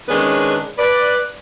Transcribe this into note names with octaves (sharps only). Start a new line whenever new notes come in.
D#3 G#3 C#4 D4 G#4 B4
B4 D5